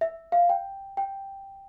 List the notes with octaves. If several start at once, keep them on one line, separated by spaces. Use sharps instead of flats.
E5
F5
G5
G5